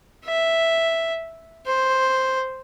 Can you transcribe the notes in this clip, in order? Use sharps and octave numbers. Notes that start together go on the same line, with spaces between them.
E5
C5